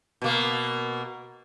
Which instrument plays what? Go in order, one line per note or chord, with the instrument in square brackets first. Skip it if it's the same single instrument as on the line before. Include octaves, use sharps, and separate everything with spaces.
[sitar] B2 A#3